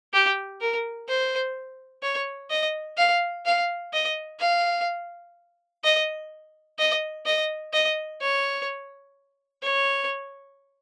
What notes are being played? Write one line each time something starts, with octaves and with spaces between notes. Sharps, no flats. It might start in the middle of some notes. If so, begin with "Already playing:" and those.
G4
A#4
C5
C#5
D#5
F5
F5
D#5
F5
D#5
D#5
D#5
D#5
C#5
C#5